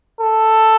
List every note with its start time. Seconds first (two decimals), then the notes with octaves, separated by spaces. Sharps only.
0.21 A4